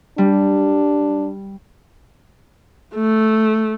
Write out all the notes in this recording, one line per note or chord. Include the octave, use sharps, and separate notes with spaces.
G3 D4
A3